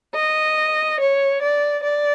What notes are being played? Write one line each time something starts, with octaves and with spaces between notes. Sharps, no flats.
D#5
C#5
D5
D5